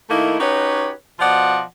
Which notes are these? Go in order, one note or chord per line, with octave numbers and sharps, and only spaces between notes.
D#3 A3 A#3 D#4 E4
C#4 D#4 F#4 G4 B4 C#5
B2 F3 F4 D5 D#5 F#5